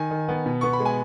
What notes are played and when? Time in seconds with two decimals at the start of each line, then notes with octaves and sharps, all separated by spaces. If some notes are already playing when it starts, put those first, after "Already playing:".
Already playing: D#3 G#5
0.11 D#3
0.28 B3
0.46 B2
0.61 B3 C#6
0.73 B5
0.80 G#3
0.85 G#5